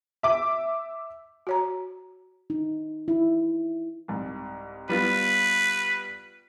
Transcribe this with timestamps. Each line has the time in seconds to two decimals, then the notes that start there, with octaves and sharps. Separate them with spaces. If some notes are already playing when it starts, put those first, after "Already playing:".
0.23 E5 D6
1.47 F#4 C#5 A#5
2.50 D#4
3.08 E4
4.08 C2 G#2
4.89 G3 B3 F4 B4